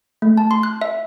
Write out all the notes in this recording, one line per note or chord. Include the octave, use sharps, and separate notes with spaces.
A3
A5
C6
F#6
E5